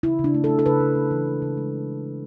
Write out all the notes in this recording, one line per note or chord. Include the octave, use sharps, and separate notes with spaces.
C#3 E4
C#3
D4
A3
A4
A3
A4
C#3 B4
C#3
A3
E3
G#3
C#3
G#3